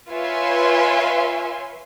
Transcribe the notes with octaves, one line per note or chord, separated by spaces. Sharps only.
F4 B4 C#5 E5 G#5 C6